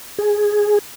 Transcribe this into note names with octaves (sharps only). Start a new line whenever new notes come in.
G#4